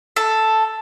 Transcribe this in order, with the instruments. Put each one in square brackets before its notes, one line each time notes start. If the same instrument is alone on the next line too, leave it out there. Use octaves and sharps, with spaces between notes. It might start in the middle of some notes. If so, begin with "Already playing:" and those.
[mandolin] A4